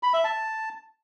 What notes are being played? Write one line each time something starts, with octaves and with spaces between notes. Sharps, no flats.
B5
E5
A5